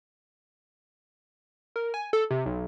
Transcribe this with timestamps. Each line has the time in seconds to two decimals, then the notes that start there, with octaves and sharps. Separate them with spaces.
1.76 A#4
1.94 G#5
2.13 A4
2.31 C3
2.46 B1